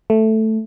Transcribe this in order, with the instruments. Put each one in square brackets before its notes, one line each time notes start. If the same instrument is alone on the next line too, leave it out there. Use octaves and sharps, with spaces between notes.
[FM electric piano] A3